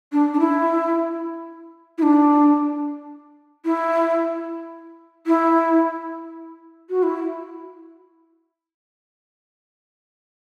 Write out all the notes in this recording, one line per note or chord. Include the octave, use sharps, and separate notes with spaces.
D4
D4
E4
E4
D4
E4
E4
F#4
E4